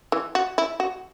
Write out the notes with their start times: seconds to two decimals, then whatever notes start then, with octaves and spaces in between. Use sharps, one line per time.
0.12 E3
0.35 F#4
0.58 E4
0.80 F#4